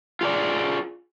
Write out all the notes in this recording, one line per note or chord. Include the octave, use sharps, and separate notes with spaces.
F4 G#4 D5